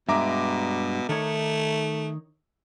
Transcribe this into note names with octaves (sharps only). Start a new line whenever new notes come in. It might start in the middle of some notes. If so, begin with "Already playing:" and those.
G2 B2 G#3 E5 A#5 D6
D#3 A3 D#4 C#5